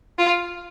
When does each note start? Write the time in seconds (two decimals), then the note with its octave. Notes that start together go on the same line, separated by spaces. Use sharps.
0.18 F4